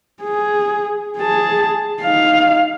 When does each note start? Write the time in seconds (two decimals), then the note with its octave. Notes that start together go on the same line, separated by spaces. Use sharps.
0.23 G#4
1.18 G#4 A5
2.02 D#4 F5